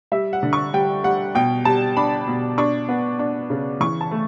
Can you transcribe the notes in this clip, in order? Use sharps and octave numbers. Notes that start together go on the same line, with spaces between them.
G3 E5
F#5
D3
C#6
G3 G5
G3 F#5
B2 G5
G3 A5
D4 B5
B2
D4 C#6
B3
D4
C#3
E3 C#6
A5
A3